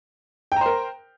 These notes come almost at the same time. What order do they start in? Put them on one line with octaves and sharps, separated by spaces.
G5 A#5 C5 A#4